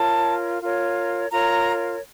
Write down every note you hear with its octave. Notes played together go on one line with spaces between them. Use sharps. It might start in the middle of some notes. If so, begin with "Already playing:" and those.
Already playing: F4 A#4 C#5 A5
F4 A#4 C#5
F4 A#4 C#5 A#5